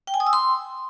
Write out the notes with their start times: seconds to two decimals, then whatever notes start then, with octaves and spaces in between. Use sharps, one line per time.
0.07 G5
0.14 G#5
0.20 D#6
0.27 E6
0.33 C6